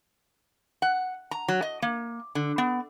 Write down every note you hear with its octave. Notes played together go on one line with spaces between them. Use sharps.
F#5
A#5
F#3
D#5
A#3
D3
B3